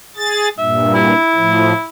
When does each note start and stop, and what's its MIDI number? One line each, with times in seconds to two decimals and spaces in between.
0.16 0.49 68
0.16 0.49 93
0.58 1.13 43
0.58 1.13 46
0.58 0.92 76
0.94 1.87 64
1.35 1.73 45
1.35 1.73 53